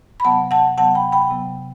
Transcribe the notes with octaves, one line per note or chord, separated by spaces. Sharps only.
B5
C3 F#3 B3 F#5 A5
F#5 A5
C3 F#3 B3 F#5 A5
G5 B5
G5 B5
C3 F#3 B3